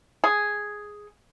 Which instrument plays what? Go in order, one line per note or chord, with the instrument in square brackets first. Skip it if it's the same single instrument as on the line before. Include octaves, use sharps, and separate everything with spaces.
[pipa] G#4